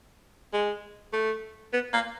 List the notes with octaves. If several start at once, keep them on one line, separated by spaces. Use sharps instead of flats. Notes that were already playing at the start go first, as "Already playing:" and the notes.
G#3
A3
B3
A#3